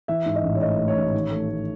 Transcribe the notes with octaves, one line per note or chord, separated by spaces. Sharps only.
E3 E5
G#2
D#5
A1
C#5
A3 D#5
A3
C#5
A1
D#3
A3
A3